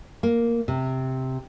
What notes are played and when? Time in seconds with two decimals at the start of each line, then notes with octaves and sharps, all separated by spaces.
0.23 A#3
0.68 C3